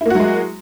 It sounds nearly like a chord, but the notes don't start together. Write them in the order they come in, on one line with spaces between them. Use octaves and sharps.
E4 A#3 F#4 F#3 G#3